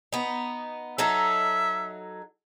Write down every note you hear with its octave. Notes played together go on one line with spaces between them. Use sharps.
B3 D#4
F#3 D#4 A4 E5